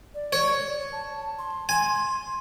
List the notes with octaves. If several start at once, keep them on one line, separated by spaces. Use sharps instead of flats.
D5
C#5
A5
C6
G#5